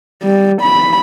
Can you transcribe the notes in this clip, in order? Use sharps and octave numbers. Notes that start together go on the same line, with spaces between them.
G3
B5